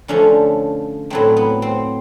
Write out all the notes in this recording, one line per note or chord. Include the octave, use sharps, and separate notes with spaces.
D3 F3 A3 C#4
A2 F#3 A3 C4
B3
C4